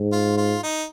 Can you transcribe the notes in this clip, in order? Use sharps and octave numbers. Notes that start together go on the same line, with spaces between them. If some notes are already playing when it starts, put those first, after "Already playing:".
Already playing: G#2
F4
F4
D#4